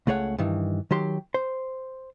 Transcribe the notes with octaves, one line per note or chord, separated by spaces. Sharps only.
C#2 A3 G#4 C#5 F#5
G2 D#3 E3
D#3 F#3 G4 C6
C5